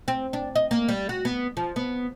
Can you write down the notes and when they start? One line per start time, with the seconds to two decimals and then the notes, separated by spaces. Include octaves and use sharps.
0.08 C4
0.33 D4
0.55 D#5
0.71 A#3
0.89 G3
1.09 F#4
1.25 B3
1.57 F3
1.76 B3